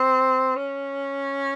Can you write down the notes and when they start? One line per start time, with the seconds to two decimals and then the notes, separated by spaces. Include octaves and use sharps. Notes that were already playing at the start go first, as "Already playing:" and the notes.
Already playing: C4
0.56 C#4